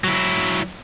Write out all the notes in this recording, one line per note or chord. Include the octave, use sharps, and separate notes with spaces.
F#3 E4